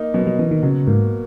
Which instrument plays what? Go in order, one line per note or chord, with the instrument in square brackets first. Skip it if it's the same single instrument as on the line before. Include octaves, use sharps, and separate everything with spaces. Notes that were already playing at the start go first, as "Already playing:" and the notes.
Already playing: [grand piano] A#3 D#4
[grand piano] B2 [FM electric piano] F#3
[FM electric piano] F#3
[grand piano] B2 [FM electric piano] E3
[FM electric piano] D#3
[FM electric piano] C#3 [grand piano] F#3
[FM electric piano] G#2 [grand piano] A#3